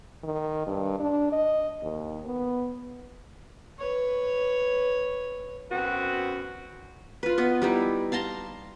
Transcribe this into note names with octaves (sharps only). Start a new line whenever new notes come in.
D#3
G2
D4
D#5
D#2
B3
B4 C#5
F#2 B3 C4 F#4
F4 B4
B3 D#5
G3 D#4 E4
F5 A5 A#5 C6